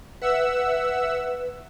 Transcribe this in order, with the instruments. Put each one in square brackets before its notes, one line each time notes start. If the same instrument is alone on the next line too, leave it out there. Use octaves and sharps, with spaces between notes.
[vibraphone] B4 [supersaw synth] E5 F#5 E6